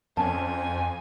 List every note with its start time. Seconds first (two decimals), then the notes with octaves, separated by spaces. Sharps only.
0.17 F2 C#4 G#5 A5